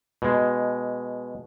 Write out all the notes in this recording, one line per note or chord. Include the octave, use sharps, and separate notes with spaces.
B2 G#3